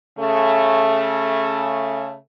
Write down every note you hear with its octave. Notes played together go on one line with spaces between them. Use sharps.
C#3 A3